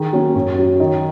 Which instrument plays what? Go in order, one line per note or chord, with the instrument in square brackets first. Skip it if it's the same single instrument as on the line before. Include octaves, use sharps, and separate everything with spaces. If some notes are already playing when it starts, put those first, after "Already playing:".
Already playing: [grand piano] D#3 G#4
F#3 A#3 C#4
F#2 C#5
F#3 C#4
D#3 D#5